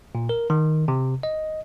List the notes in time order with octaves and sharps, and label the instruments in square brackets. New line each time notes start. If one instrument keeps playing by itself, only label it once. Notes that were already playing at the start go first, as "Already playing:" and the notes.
[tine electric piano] A#2
A#4
D#3
C3
D#5